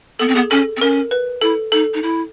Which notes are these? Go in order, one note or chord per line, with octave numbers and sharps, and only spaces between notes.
B3 A4
C4
B3 G#4
C#4 A4
C4
C#4 A#4
B4
E4 A4
D#4 A4
D#4
E4